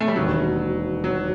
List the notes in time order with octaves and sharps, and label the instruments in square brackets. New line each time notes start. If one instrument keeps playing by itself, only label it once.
[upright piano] A3
G3
[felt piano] E1 D#2 D#3 [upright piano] F#3
[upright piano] F#3